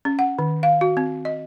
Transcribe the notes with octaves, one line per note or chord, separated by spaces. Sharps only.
C#4
F#5
D#3
F5
F#4
C4
D#5